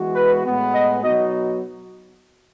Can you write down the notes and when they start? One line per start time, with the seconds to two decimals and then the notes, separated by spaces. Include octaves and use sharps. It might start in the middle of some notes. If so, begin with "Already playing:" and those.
Already playing: E3 G#3 B3 F#4
0.14 B4
0.45 A2 G#3 B3
0.73 D#5
1.03 B2 F#3 B3 D#4 F#4 D#5